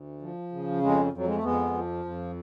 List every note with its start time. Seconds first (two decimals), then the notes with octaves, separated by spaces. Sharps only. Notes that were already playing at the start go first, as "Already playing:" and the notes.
Already playing: D2
0.22 F3
0.52 C#3
0.82 F2 G#3
1.13 F2
1.18 F#3
1.27 G#3
1.36 A3
1.43 F2 G#3 B3
1.73 F3
2.05 F2